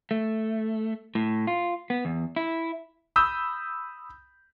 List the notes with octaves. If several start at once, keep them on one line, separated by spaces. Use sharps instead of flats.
A3
A2
F4
B3
E2
E4
B5 D#6 E6 G6